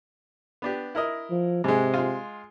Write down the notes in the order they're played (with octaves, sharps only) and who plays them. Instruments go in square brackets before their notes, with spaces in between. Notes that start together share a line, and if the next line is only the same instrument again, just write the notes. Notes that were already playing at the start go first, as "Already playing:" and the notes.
[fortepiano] B3 D4 G4
E4 A#4 D#5
[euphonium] F3
[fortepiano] G#2 G#3 [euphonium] C3
[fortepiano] G#3 F4